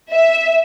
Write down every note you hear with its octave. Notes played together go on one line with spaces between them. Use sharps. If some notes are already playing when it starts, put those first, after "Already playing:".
E5